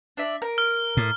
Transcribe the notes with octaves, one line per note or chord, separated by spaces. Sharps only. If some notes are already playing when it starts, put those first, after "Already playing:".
D4 D5 E5
A#4
F6
A2